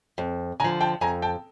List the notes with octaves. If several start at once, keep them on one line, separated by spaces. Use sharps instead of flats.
F2
D3 F3 G#5 A#5
G5 A5
F2 G#5 A#5
G5 A5